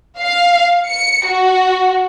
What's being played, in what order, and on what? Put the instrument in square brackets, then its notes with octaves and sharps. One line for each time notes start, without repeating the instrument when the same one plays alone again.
[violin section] F5
C#7
F#4